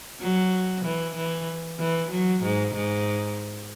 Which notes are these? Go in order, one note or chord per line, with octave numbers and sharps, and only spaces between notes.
F#3
E3
E3
E3
F#3
G#2
G#2